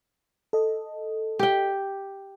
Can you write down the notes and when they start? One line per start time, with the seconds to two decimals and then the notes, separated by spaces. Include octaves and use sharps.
0.53 A4 D#5
1.39 G4 G5